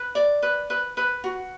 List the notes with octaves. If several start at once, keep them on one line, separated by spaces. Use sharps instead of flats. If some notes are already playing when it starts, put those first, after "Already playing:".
Already playing: B4
D5
B4
B4
B4
F#4